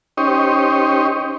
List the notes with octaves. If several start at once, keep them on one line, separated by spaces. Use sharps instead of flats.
C#4 D#4 G4 C5 C#5 D#5